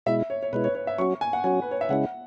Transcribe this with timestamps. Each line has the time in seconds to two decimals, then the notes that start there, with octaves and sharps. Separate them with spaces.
0.06 B2 G#3 E4 E5
0.30 C#5
0.43 C#5
0.53 B2 G#3 E4 B4
0.64 C#5
0.75 C#5
0.87 E5
0.98 F#3 C#4 F#4 C#6
1.21 G#5
1.33 F#5
1.44 F#3 C#4 F#4 G#5
1.62 B4
1.71 C#5
1.81 E5
1.89 C#3 G#3 C#4 E4 F#5